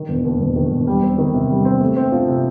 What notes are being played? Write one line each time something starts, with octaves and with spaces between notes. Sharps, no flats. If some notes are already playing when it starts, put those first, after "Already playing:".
Already playing: D#3
E1
D#2
E1
D#3
E1
G3
C4
D#3
C3
G3
C4
A3
C4
F3
C3